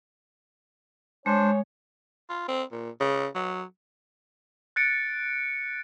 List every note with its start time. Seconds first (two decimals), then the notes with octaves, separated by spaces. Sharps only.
1.26 G#3 D4 C5 C#5
2.29 F4
2.48 C4
2.72 A#2
3.00 C#3
3.35 F#3
4.76 F#6 A6 C#7 D7